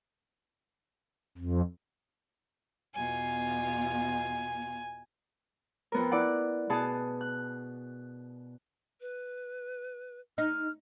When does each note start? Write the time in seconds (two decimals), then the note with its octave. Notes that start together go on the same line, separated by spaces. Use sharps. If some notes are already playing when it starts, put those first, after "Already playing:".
1.38 F2
2.95 E2 B2 F4 G#5
5.92 F2 B3 A#4
6.11 E4 D5 F#5
6.70 B2 B3 G#4 A5 D#6
7.21 F#6
9.01 B4
10.38 D#4 F6